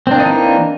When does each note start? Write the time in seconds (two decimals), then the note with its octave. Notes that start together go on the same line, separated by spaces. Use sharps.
0.07 C4
0.11 D4
0.15 A#3
0.20 D#4
0.24 E3